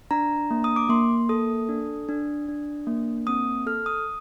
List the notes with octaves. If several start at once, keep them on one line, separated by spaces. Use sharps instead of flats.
D4 A#5
A#3
D#6
D6
A#3 C6
A4 D#6
D4
D4
D4
A#3
C4 D#6
A4 F6
D#6